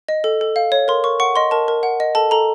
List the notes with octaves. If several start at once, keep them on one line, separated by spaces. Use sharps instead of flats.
D#5
A4
A4
F5
C#5
A#4 C6
A#4 C#6
F#5 C#6
D#5 C6
A#4 A5
A#4
F#5
D#5
A4 A5
A4 A#5